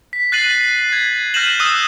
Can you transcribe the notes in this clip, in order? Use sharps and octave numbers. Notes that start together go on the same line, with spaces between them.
B6
F#6 A6 C7 D#7 F#7
G#6
F6 G6 A#6 D#7 E7 F#7
D#6 E6 F#6 D#7 E7